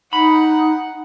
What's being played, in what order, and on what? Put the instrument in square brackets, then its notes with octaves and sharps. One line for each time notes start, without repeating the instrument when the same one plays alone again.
[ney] D#4 [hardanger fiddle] F#5 [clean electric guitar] B5